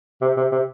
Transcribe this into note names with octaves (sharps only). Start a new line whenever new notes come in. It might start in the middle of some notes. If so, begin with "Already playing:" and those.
C3
C3
C3